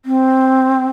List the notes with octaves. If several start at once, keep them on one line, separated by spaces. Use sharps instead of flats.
C4